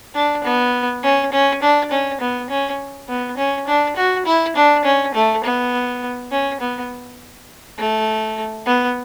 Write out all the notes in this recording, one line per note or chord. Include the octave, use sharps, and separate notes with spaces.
D4
B3
C#4
C#4
D4
C#4
B3
C#4
B3
C#4
D4
F#4
E4
D4
C#4
A3
B3
C#4
B3
A3
B3